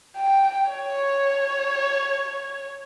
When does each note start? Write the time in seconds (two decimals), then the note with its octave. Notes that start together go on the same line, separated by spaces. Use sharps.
0.17 G5
0.71 C#5